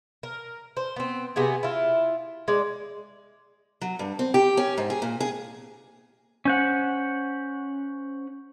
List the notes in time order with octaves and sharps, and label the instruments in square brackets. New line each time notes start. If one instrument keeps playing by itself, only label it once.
[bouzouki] A#4
C5
B3 C4
C3 B3 G4 G#4
E4 F4
G#3 D5
[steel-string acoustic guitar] F#3
G2
C4
G4
C#4
G#2
G#4
A#2
G#4
[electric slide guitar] C#4 C5 F#5